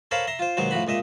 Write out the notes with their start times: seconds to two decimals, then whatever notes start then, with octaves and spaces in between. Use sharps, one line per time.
0.11 A4 A#4 C5 C#5 F5 B5
0.27 E5 A#5 C6
0.39 F4 C5
0.57 D#2 B2 F#3 G#3 C5
0.71 A2 F3 F#4 B5
0.87 C#2 A#2 D#5 E5